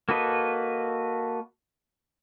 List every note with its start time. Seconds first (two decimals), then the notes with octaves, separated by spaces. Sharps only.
0.09 A#3 F#4 A4 B4 D#5